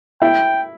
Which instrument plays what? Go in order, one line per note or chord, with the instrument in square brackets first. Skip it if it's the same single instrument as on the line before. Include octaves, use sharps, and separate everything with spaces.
[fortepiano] E4 [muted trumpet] G5